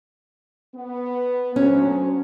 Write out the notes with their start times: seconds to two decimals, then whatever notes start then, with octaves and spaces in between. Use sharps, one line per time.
0.75 B3
1.56 D2 F#3 C#4 C5